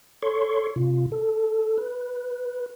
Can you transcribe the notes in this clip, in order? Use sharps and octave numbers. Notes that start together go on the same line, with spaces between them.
A4 C#5 C6 C#6
C3 F4
A4
B4